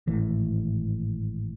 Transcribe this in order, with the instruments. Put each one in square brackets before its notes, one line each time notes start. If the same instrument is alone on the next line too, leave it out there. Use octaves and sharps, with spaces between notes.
[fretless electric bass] G#1 A2 E3